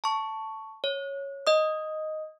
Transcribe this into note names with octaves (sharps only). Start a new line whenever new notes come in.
A5 C#6
C#5
D#5 D#6